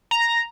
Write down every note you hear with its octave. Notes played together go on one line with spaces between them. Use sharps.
A#5